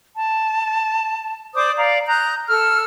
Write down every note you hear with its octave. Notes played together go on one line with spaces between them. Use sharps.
A5
C5 D5 D6 D#6
D5 F5 A#5
A#5 D#6 F#6 G6
A4 E6 F6